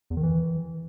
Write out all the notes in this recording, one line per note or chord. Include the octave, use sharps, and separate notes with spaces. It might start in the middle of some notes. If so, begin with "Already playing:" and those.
E2
D#3
E3